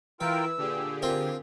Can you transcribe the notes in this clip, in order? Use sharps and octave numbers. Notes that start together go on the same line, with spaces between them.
E3 E4 F4 A#4 B4 G5 E6
A#2 D3 G4 G#4
C4 F4 A#4